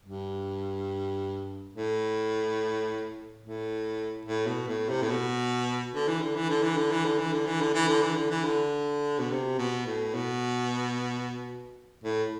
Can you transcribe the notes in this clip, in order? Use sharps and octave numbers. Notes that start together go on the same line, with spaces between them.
G2
A2
A2
A2
B2
A2
C3
A2
B2
D3
E3
D3
E3
D3
E3
D3
E3
D3
E3
D3
E3
D3
E3
D3
E3
D3
E3
D3
B2
C3
B2
A2
B2
A2